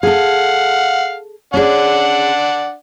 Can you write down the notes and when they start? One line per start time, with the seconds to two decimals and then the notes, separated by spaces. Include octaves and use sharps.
0.03 G#4 A4 F5 F#5
1.54 C#4 D4 G#4 D5 F#5